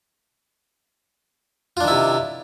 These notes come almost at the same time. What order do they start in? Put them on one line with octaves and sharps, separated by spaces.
F4 D4 D#3 E4 C3